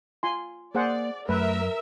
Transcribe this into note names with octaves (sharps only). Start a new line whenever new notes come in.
F4 G#5 C6
A#3 G#4 C5 D5 F#5
F#2 A3 A#4 B4 E5